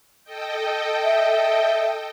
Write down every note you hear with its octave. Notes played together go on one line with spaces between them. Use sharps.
A4 D#5 G5
E5